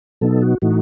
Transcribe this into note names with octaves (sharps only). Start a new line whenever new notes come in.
B2 F#3 B3 D#4 A4
F#4
A2 E3 A3 D#4 F#4